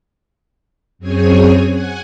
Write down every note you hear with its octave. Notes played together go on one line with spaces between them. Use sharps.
F#2 C4 G#4 C#5 G#5
F#5 G#5